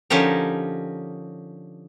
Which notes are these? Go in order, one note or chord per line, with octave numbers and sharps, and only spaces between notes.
D3 F3 C#4 D#4 G4 A#4